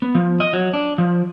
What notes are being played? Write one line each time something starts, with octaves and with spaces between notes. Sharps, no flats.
B3
F3
D#5
F#3
D4
F3